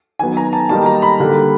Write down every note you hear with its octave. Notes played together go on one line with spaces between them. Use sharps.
D#3 F#3 B3 G#5
A#5
A5
D#3 G3 A#3 D#4 A5
A#5
B5
D3 G3 A#3